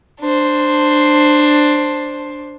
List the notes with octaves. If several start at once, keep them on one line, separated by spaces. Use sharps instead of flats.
D4 C5